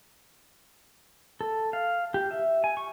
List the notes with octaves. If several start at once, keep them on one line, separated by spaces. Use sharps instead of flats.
A4
F5
G4
E5
G#5
C#6